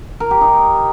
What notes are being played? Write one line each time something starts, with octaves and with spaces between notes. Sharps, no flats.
A#4
G4
D#4